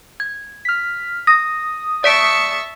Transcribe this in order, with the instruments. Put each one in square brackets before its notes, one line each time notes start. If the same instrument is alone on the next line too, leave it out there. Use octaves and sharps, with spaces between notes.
[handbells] G#6
[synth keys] F6 B6
[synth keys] D#6 [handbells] A#6
[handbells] D5 B6 D7 [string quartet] E5 A5 C#6